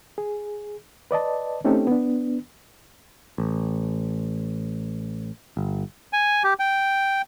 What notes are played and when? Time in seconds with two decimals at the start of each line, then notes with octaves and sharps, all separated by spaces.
0.18 G#4
1.11 B4 D5 D#5 A5
1.64 A3 C4 C#4 D#4 G4 A4
1.87 B3 D4
3.38 A1
5.57 G1
6.13 G#5
6.44 G4
6.59 G5